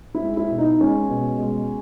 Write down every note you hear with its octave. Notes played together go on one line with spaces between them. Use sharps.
E4
G#3
E4
B2
D#4
G#3 C#4
B2
G#3